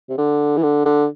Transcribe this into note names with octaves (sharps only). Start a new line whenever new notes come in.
C3
D3
E3
D3
D3